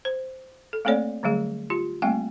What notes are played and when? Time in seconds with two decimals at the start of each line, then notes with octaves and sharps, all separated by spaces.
0.05 C5
0.73 A4
0.85 A3 A#3 C4 A4 C#5 D5
1.23 D3 F#3 G3 A3 G#4
1.70 F4 G4
2.02 G3 A3 A#3 C4 G5 G#5